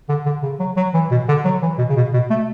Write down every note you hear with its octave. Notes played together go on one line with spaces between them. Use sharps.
D3
D3
C#3
F#3
F#3
E3
B2
D3
F#3
E3
B2
C#3
B2
B2
A3